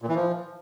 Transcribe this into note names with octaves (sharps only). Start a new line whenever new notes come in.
A#2
E3
F3